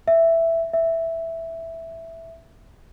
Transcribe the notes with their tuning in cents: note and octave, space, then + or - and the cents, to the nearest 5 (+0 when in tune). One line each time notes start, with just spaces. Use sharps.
E5 +5
E5 +0